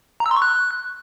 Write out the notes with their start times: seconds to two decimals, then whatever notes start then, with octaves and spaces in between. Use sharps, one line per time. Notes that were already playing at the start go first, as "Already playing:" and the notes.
0.20 A#5
0.26 E6
0.31 C6
0.36 C#6
0.42 F#6